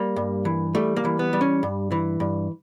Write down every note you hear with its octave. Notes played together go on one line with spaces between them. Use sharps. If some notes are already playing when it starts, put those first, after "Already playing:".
Already playing: G3 A#3
G2
E3
G3 A3
A#3
E3
B3
G3
C#4
G2
E3
G2